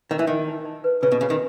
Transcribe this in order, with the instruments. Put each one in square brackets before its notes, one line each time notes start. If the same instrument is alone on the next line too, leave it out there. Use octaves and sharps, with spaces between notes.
[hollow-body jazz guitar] D#3 [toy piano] A#4
[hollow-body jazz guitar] E3
[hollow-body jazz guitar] D#3 [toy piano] D#5
[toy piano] D#4
D#4
B4
[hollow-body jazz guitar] C#3 [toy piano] B4
[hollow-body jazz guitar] B2
[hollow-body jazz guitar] C#3 [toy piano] F#4
[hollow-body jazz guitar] D#3